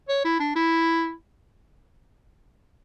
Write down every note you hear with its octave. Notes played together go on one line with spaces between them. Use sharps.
C#5
E4
D4
E4